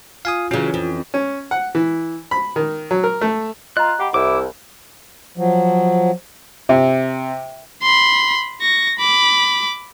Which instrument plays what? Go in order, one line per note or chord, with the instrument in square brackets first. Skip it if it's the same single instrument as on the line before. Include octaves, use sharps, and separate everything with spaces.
[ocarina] F4 [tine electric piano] F5 G#5 D#6
[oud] C#3 F#3 [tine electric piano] E3 C#4
[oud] F2
[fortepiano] C#4
F#5
E3
B5
D#3
F#3
A#4
A3
[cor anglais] F4 [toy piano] D#5 A#5 [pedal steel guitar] F#6
[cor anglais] G4 [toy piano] F#5 B5
[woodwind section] C2 [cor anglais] E4 [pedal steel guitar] D6
[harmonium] F3 F#3
[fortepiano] C3
[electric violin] B5 C6
C#6 A#6
B5 D6